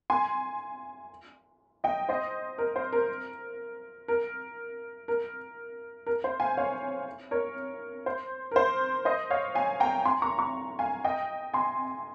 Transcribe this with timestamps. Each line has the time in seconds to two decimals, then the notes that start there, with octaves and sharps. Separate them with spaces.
0.10 G#5 C6
1.84 D#5 G5
2.09 C5 D#5
2.58 A#4
2.76 C5
2.93 A#4
4.08 A#4
5.08 A#4
6.06 A#4
6.24 C5
6.40 F5 G#5
6.57 C#5 F5
7.31 A#4 C#5
8.06 C5
8.51 A#4
8.56 C5
9.05 C5 D#5
9.30 C#5 F5
9.55 F5 G#5
9.80 G5 A#5
10.05 G#5 C6
10.22 A#5 C#6
10.38 A#5 C#6
10.79 F5 G#5
11.04 D#5 G5
11.54 G#5 C6